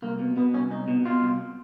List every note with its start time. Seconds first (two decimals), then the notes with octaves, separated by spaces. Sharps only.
0.02 C2 A#3
0.19 B2
0.37 B2 B3
0.54 C2 C#4
0.70 C2 D#4
0.88 B2
1.05 B2 F4
1.22 C2